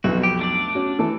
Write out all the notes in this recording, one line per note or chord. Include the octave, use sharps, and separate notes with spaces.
B1 F2 F#4
G4
A3 D4 D5
C#4 F#4
E3 A3 A4